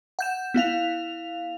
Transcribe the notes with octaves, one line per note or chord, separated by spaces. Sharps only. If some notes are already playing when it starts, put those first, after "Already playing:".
F#5 G6 E7
B3 E4 F5 F7